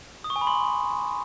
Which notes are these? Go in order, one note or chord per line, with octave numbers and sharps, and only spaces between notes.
D#6
C#6
G#5
B5
C6